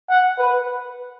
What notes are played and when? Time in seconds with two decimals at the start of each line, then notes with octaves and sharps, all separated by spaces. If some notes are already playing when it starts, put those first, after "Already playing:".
0.10 F#5
0.39 B4